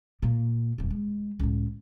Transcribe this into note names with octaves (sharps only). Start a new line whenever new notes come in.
A#2 A#3
D#1 F2
G#3
C#2 A2